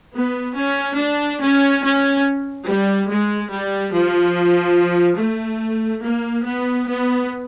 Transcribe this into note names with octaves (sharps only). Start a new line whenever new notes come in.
B3
C#4
D4
C#4
C#4
G3
G#3
G3
F3
A3
A#3
B3
B3